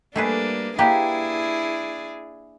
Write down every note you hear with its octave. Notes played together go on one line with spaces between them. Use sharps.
G3 A3 A#3 D4 G#4 B4
A#3 D4 E4 G4 G#4 B4